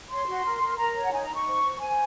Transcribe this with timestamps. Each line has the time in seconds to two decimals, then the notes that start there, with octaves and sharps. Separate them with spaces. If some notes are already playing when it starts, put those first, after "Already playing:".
0.09 C#5 C6
0.26 F#4
0.44 A#4
0.61 A#4
0.78 A#4 A#5
0.94 C#5
1.03 F#5
1.12 D#4 G#5
1.23 A#5
1.29 D#4
1.34 C#6
1.46 C5
1.63 C5
1.80 C5 G#5